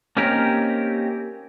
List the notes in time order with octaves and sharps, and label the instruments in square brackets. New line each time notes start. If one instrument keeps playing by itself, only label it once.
[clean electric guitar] A#3 C4 C#4 D#4 G4 A#4